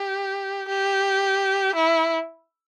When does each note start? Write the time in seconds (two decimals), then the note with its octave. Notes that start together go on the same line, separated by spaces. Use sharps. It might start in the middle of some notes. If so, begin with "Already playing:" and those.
Already playing: G4
0.68 G4
1.75 E4